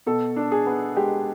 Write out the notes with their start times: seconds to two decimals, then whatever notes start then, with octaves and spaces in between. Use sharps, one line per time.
0.06 B2 A4
0.36 D4
0.52 G#4
0.66 B3
0.97 G#3 G4